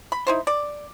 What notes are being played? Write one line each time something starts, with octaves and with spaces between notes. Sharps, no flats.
B5
D#4 E4 C5
D5